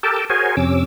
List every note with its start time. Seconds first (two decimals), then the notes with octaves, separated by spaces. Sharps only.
0.03 G4 A4 A#4 G5 A5
0.30 F#4 G#4 A#4 C5 C#5 G#5
0.57 F2 C3 C#4 D6 E6